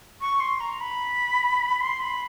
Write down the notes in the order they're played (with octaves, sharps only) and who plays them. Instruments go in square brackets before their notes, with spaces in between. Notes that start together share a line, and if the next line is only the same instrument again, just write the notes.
[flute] C#6
C6
A#5
B5
C6
B5